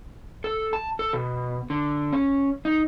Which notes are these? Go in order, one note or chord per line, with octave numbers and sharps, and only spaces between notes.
A4
A5
A4
B2
D3
C#4
D#4